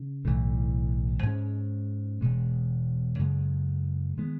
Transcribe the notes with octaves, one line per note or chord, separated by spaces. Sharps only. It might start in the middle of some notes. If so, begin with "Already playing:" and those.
Already playing: C#3
B1 A2 E3
G#2 E3 G#3 C#4
E1 E2 B2 G#3
F#2 C#3 G#3
D#3 G#3 B3